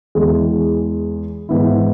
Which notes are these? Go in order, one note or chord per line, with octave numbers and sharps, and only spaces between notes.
E2 E3 G#3
G#2 E3 B3 E4